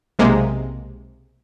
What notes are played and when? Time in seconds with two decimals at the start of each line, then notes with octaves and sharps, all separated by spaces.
0.19 B1 C3 G#3 A#3